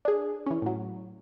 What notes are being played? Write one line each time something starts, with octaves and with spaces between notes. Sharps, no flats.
D4 G#4
E3 C#4
A2 F#3